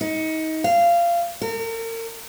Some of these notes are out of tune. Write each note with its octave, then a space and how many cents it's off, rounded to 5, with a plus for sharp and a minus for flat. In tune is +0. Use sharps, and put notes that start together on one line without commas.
D#4 +25
F5 -20
A#4 -40